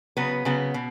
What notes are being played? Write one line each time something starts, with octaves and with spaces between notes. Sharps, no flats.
C#3 F#3 B3 B4
C#3 F#3 B3
B2